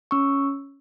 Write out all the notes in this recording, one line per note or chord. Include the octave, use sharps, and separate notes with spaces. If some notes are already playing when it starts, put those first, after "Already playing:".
C#4 C#6 E6